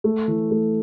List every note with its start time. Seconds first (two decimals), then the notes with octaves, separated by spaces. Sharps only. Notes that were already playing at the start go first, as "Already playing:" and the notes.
0.04 A3
0.28 E3
0.51 A3